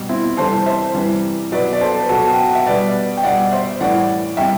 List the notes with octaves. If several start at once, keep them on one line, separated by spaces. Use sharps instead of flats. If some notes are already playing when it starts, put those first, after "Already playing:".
Already playing: B2 G3
C4 E4
C3 E3 G3 A4 C5
C5 E5
C3 E3 G3
B2 F#3 B4 D5
D5
A4 C5
B4
B2 F#3 F#4 A4
G5
F#5
E5
B2 G3 B4 D5
G5
B2 G3 D5 F#5
C5 E5
A2 E3 G3 D5 F#5
C3 G3 E5 G5